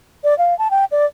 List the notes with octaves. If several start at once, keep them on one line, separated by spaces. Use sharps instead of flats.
D5
F5
A5
G5
D5